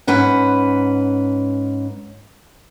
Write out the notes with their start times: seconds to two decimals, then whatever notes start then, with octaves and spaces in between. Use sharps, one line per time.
0.07 G#2 C#4 B4 F#5